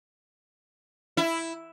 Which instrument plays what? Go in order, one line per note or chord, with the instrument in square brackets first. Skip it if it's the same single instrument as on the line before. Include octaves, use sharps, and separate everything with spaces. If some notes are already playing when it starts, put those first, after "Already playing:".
[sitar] E4